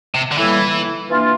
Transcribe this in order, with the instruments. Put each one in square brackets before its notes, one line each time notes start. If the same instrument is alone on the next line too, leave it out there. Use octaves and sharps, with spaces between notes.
[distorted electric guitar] C3
D3
[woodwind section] A2 G3 A#3 E4 [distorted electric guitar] E3
[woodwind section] E3 A#3 D4 F4